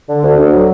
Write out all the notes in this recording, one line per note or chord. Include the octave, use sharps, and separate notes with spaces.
D3
D2
D2
F#3